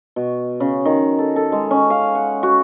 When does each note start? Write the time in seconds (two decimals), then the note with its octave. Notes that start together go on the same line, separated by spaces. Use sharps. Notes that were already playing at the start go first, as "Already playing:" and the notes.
0.16 B2
0.60 C#3
0.85 D#3
1.19 A4
1.36 A4
1.52 G#3
1.71 C#4
1.90 F5
2.15 F#5
2.43 F#4